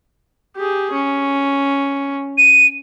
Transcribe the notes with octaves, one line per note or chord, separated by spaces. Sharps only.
G4 G#4
C#4
D#7